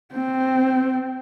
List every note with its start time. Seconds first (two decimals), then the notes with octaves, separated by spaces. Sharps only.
0.13 C4